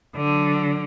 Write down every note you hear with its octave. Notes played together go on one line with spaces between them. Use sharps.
D3 F#3